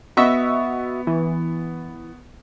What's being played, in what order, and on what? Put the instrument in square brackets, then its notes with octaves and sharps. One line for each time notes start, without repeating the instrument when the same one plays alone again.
[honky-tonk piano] B3 C#6 [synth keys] F#4 D#5 E5
[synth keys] E3